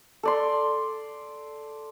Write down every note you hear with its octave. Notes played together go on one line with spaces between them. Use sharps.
A4 D5 C6